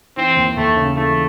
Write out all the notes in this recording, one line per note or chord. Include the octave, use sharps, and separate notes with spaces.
E3 C4
D#2
D#2 A3
C#3
E3 A3